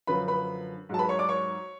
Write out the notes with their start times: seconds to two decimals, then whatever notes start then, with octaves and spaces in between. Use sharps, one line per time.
0.07 F#2 D3 F3 B4 B5
0.28 B4 B5
0.89 G#2 F#3 A5
0.99 B4 B5
1.09 C#5 C#6
1.19 D5 D6
1.29 C#5 C#6